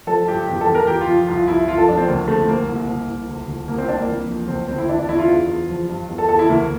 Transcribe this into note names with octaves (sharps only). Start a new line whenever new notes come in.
F3 A4
G2 G4
E2 G4
A4
E2
A#4
E3 G4
F4
F2
C2 F4
C2 E4
F2 F4
A4
F2 D4
C4
D2 A#3
D2 A3
C4
C2 A#3
C2
C2
C2
D2
D2
C2 A#3
C4
C2 D4
A#3
E3
F2
D2 C4
D2 C4
E4
E3 D4
D4
E2 E4
F4
E2
E2
F3
G2
E2
A4
E2 A4
E4
D2 A#3